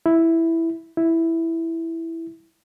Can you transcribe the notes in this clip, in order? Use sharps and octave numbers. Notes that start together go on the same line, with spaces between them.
E4
E4